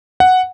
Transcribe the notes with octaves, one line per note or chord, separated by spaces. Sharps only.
F#5